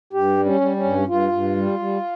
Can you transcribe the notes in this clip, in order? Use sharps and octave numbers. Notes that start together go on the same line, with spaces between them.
G2 G4
G3
C#4
G3
C#4
G2
G2 F4
G2
G3
G3